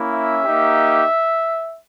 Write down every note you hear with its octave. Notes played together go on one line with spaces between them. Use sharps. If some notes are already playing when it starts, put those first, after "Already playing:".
Already playing: A#3 C#4 E4
E5
A#3 D#4 G4